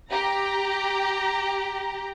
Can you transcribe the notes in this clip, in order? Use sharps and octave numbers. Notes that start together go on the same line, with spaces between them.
G4 A#5